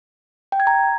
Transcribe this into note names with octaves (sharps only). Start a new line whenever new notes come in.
G5
G#6
A#5